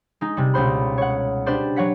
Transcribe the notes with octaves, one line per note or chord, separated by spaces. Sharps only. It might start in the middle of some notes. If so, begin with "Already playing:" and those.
G#3 D#4
C3 G3
C#2 B2 C5 B5
C#5 F#5
D4 G4 B4 C5 D5
F#3 C#5 F#5 B6